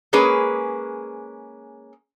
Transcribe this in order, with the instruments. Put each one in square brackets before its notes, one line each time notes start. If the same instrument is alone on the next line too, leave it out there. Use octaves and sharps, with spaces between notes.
[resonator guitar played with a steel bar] G#3 A#3 C#4 G#4 B4